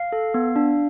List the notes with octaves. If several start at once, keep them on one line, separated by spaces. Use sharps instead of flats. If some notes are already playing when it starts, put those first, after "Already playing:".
Already playing: F5
A4
B3
D4